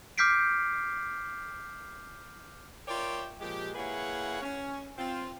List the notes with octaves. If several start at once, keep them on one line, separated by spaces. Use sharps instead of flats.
D6 F6 G6 B6 C7 D7
F4 A#4 C#5 D5 E5 G5
A#2 F3 G#3 G4
A#3 E4 G#4 B4 C#5 F#5
C#4
C4 F4